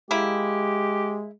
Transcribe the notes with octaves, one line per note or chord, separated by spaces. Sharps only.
G#3 A#3 E4 G4